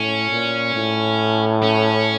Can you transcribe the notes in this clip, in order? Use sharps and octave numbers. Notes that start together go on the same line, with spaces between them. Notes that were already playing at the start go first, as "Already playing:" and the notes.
Already playing: A2 C#4
A#2
A2
C#4